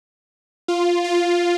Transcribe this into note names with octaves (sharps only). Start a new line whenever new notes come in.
F4
F4